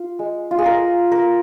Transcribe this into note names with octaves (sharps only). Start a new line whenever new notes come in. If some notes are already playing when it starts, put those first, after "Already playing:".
Already playing: F4
G#3
F4
G#4
F4 A#4
A#3 A#4